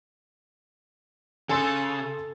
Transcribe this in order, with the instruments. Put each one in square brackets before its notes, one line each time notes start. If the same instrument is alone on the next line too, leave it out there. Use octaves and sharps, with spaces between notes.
[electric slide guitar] C#3 [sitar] A4 [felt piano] G#5 C6 E6